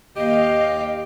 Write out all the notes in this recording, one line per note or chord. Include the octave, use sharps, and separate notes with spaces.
D#2 G4 D#5 F5